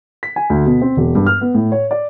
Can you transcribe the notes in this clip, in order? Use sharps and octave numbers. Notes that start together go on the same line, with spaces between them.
B6
G#5
D2
B2
C4
E1
G2
F6
B3
A2
C#5
D5